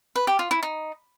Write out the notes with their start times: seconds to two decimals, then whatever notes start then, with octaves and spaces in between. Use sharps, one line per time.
0.16 B4
0.27 G4
0.39 F4
0.51 E4
0.63 D#4